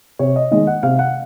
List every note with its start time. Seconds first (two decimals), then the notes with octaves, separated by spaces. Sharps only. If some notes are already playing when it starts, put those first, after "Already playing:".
0.19 C3 C#5
0.36 D#5
0.51 D#3 G#3 D#5
0.67 F#5
0.83 C3 F5
0.99 F#5